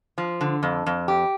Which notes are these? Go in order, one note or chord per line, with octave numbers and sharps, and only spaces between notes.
F3
D3
F2
F2
G4